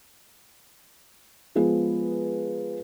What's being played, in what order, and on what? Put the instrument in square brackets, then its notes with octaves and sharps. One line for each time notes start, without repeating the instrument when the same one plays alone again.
[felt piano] F3 G#3 B3 G#4 B4